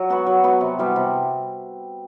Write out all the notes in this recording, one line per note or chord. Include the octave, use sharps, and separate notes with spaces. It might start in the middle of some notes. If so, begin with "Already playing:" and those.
Already playing: F#3
B3 F#4 B4
F#3
B3 F#4 B4
C3
E3 G3 B3
C3